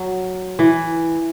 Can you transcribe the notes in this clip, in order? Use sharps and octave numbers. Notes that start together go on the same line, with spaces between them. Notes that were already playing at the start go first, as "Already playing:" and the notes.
Already playing: F#3
E3